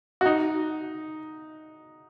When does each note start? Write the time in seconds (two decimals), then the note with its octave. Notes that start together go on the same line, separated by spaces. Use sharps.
0.21 F#4
0.26 D#4